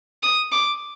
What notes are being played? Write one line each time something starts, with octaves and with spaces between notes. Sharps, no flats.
D#6
D6